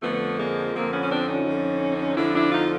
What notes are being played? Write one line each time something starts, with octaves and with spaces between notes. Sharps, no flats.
F2 D3 F3 A3 B3
G#3 A#3
F2 D3 F3 A#3 C4
B3 C#4
C#4
C4 D4
C#4 D#4
F2 D3 F3
F2 D3 F3 D4 E4
D4 E4
D#4 F4